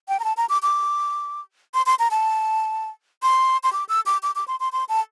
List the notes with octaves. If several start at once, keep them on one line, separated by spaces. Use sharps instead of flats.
G5
A#5
A5
A#5
D6
D6
C6
C6
A#5
A5
C6
C6
D6
E6
D6
D6
D6
C6
C6
C6
A5